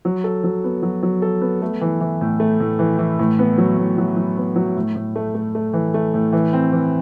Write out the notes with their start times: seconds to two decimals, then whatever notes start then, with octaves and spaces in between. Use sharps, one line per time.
0.05 F#3
0.24 A4
0.44 F#3
0.64 B3
0.83 F#3
1.03 F#3
1.22 A4
1.41 B3
1.62 A3
1.81 E3
2.01 E3
2.21 A2
2.40 A3
2.60 A2
2.79 E3
2.99 E3
3.19 A2
3.39 B3
3.58 F#3
3.77 A2
3.98 F#3
4.16 F#3
4.37 B3
4.56 F#3
4.76 A2
4.96 A2
5.16 A3
5.35 A3
5.55 A3
5.73 E3
5.94 A3
6.14 A2
6.33 E3
6.53 C4
6.73 E3